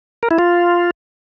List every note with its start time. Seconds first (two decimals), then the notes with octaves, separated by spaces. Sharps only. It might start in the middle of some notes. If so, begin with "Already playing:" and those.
0.23 A#4
0.31 E4
0.39 F4